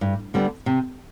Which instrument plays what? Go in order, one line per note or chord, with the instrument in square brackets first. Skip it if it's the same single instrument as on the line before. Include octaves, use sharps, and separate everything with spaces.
[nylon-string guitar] G2
D3 G3 B3 D4
C3